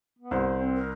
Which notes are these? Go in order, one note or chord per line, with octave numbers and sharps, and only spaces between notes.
B3
C2 C5
C4
A#4